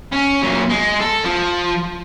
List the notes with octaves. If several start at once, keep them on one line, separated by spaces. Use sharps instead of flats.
C#4
A#2 F#3
G#3
A4
F3